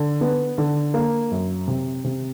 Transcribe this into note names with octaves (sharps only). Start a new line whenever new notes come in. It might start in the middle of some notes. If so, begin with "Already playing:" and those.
Already playing: D3
B3
D3
A#3
F#2
C3
C3